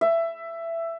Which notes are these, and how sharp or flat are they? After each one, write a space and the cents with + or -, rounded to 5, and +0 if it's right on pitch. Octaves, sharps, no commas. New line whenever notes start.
E5 +15